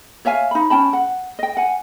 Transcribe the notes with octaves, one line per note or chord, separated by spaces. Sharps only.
C#5 E5 F5 G#5
D#4 B5
C#4 G5 A5 B5
F#5
D#5 G5
F#5 G#5